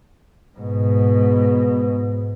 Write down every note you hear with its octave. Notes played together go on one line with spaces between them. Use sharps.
G#2 B2